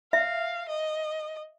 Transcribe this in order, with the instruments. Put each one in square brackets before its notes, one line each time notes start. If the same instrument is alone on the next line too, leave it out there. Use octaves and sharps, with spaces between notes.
[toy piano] E5 [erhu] F5
[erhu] D#5